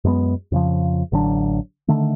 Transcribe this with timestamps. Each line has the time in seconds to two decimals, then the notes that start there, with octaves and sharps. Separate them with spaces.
0.04 F#2 G#3 A#3 B3
0.52 F2 C#3 F3
1.12 A1 D3 F#3 D4
1.88 D3 D#3 A3